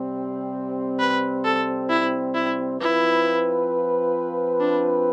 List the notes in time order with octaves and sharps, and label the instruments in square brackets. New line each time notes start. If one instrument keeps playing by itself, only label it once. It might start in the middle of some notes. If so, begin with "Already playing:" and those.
Already playing: [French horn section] C3 G3 C4
[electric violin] B4
A4
E4
E4
[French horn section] F3 C4 F4 B4 [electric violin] E4
[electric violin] D4